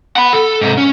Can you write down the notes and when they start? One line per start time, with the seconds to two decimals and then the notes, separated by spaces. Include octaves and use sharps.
0.16 F#5 B5
0.33 A4
0.61 G#2 C3
0.78 C#4